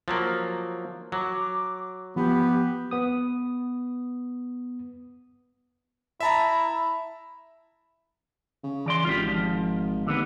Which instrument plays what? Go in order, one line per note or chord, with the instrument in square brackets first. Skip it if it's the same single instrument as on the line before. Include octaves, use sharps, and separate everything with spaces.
[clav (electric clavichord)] F3 F#3 A#3
[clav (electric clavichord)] F#3 [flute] D6
[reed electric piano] F3 [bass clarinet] B3 [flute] G4
[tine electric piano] B3 D#6
[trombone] E4 [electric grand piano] E5 A5 A#5
[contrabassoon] C#3
[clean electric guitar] E3 D5 C6
[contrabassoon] G#1 [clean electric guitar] F4 G4
[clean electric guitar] F3
[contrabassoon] D#2 [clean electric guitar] D3 B3